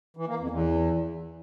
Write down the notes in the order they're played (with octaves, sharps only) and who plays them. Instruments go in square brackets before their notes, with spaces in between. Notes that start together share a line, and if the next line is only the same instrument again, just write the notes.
[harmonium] E3
A#3
F2
E2